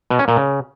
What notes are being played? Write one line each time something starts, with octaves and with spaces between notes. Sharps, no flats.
B2
C#4
A#2
C#3